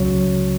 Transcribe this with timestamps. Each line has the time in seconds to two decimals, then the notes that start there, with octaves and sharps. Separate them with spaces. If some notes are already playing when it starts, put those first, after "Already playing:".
Already playing: C#2 C#3 F#3 C#5